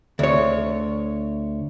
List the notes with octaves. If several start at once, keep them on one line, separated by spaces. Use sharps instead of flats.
D2 C#5